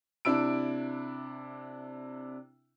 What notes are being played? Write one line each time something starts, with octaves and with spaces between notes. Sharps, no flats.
C3 D4 E4 E6 D7